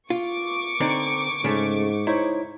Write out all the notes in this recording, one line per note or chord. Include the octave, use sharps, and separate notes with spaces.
F4 C#6 D6
D3 C4 D#4
G#2 C#3 A3
D#4 E4 C5 C#5